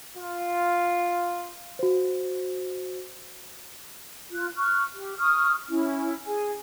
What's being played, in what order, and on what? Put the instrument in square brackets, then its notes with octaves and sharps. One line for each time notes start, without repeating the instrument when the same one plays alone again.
[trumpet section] F4
[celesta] F#4 C5
[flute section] F4 F#6
C#6 F6 F#6
G4
C#6 D#6 F6
C#4 E4
G#4 G#5